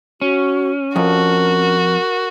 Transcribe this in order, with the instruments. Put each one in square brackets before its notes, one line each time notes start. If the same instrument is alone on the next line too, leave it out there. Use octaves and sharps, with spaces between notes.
[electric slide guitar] C#4 [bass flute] F#4
[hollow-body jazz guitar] F2 [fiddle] F#4 [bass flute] A#4